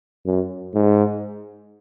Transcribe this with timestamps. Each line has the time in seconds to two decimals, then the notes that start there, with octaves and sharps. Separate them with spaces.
0.26 F#2
0.74 G#2